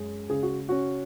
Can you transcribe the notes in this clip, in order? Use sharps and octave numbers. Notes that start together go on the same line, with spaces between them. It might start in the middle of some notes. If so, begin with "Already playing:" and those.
Already playing: F#2 G#3
C#3 G#4
F#4
C#4 F#4